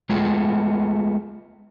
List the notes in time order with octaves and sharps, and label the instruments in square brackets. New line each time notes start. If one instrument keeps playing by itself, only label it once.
[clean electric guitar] G#3 A3 B3 F4 G#4